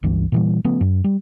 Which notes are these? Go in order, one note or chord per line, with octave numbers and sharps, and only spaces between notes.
G1 C#2 G2 E3
A#2 E3 G3
C#3 F3 A3 B3
F#2
G3